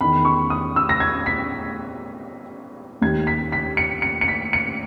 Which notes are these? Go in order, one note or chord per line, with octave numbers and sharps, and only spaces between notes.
E2 D#3 B5
C#6
D#6
E6
A#6
G#6
B6
D#2 D#3 G#6
B6
B6
C#7
C#7
C#7
B6
C#7